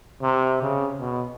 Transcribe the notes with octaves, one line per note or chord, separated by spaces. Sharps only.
C3
C#3
B2